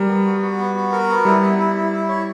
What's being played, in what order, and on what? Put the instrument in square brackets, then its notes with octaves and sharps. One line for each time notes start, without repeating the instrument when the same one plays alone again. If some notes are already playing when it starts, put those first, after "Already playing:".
Already playing: [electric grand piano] G3 [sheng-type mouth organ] A#4
[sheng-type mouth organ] B3
F#4
F#4
B3
F#4
A#4
B3
[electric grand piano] G3 [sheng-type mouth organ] E4
[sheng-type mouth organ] E4
E4
E4
E4
C#5